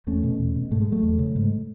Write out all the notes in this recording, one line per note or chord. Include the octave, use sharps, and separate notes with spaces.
E2 A3 C#4
B2
E2
B2
G#2 A3
G#3
F#3 A3
E2
C#3
G#2